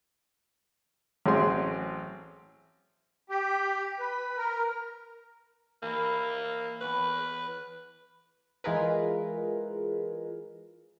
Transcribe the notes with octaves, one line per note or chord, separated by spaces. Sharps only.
A1 F#3 C4 G#4 C6
G4
B4
A#4
E3 A#3
E3 B3 B4 C#6
E3 G#3 F4 G#4 A#4 B4